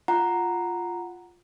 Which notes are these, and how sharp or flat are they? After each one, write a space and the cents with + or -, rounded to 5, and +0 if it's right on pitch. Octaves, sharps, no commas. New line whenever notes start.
F4 +0 F#5 +0 A#5 +0